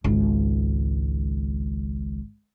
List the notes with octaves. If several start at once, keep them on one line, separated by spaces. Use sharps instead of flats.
G#1 C#2